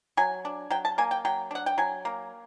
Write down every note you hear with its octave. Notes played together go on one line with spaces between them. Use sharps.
F#3 G#5
D4
F#3 G5
A5
A#3 G#5
G5
F#3 G5
D4 F#5
G5
F#3 G#5
A#3